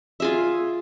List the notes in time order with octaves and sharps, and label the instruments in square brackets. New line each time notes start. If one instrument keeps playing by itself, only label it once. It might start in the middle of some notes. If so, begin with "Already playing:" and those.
[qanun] F4 G#4 E5